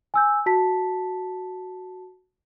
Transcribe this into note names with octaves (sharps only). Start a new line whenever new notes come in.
G#5 E6 G6
F#4 A5 B6